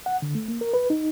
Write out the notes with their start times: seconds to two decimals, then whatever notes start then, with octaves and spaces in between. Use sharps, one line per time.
0.06 F#5
0.22 D3
0.35 A3
0.48 A#3
0.61 A#4
0.74 B4
0.90 D#4